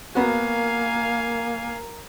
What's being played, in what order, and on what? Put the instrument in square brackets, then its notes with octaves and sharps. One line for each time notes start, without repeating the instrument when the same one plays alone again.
[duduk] A#3 [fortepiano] B3 F#4 [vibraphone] A#4 A#5 [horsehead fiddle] F5 G#5